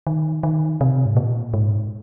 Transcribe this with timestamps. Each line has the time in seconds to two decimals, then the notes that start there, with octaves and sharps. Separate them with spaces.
0.07 D#3
0.43 D#3
0.81 C3
1.06 G#2
1.17 A#2
1.54 G#2